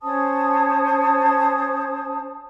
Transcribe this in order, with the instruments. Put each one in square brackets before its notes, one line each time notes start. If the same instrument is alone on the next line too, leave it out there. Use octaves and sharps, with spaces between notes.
[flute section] C#4 C5 A5 D#6